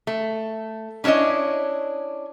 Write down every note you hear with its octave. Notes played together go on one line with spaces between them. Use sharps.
A3
C#4 D4 E4 C#5 D#5